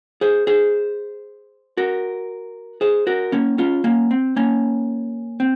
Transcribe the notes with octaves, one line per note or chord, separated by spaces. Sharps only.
G#4 C5
G#4 C5
F#4 A#4
G#4 C5
F#4 A#4
A#3 C#4
C#4 F4
A#3 C#4
C4
A#3 C#4
C4